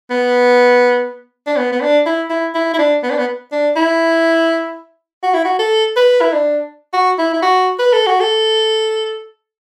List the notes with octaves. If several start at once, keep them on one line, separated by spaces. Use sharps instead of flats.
B3
D4
B3
B3
D4
E4
E4
E4
E4
D4
B3
D4
B3
D4
E4
F#4
E4
F#4
A4
B4
E4
D4
F#4
E4
E4
F#4
B4
A4
F#4
A4